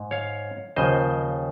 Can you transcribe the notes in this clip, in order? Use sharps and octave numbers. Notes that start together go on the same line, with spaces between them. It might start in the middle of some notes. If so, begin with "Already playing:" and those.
Already playing: G#2
C#5 F5
D#2 C#3 F3 C5 D#5